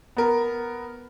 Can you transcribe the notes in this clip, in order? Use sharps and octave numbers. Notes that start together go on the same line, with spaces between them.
B3 A#4